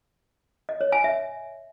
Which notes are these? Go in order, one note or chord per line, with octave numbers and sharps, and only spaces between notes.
D#5
C#5
G#5
E5